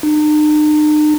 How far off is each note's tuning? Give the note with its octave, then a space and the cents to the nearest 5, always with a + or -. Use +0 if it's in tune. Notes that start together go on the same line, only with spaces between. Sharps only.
D#4 -45